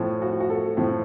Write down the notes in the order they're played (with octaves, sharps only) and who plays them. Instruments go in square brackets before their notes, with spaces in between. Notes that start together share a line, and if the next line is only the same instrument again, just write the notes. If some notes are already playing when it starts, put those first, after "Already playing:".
Already playing: [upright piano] A2 F3
F#4
F#4
A4
A2 F3